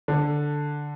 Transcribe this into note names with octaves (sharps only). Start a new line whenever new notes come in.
D3